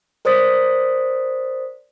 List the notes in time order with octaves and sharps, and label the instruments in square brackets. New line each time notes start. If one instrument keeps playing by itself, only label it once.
[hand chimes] A#4 C5 D5 D#6 A6 B6